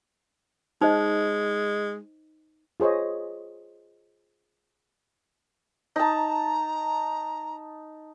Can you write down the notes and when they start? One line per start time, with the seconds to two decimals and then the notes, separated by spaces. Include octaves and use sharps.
0.81 G#3 D#4 C5 D#5
2.80 F4 G#4 C5 C#5 D#5
5.96 D#4 A5 A#5